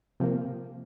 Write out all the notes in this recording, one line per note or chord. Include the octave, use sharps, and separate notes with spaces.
C3 F3 A#3